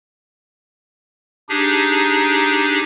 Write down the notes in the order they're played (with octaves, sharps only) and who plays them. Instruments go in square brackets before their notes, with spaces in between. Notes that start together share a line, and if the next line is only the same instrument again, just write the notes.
[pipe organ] D4 D#4 G4 G#4